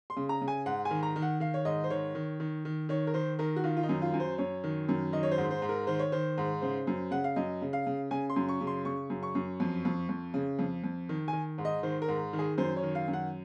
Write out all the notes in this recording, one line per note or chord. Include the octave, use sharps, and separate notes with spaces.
C6
C#3
A#5
C#3
G#5
G#2 F#5
G#5
D#3
A#5
D#3
F#5
D#3 F5
C#5
G#2 D#5
C5
D#3 C#5
D#3
D#3
D#3
D#3 C#5
A#4
D#3 C5
D#3 A#4
F#4
D#3 F4
F4
D#4
F#2
F4
F#2
C5
F#2 C#5
D#3
F#2
D#3 D#5
C#5
C5
G#2
C5
G#2
A#4
D#3 C5
C#5
D#3 C5
G#2
C#3 C5
F#2
C#3 F#5
F5
F#2 D#5
C#3
F5
C#3
C#3 G#5
C6
F#2
C#6
C#3
C6
C#3 C#6
F#2
C#6
F#2
F2
F2
F2
C#3
F2
F2
D#3
G#5
D#3
G#2
D#5
D#3 C5
A#4
G#2
D#3
G#4
F#2 C5
C#5
D#3
F5
F#2
F#5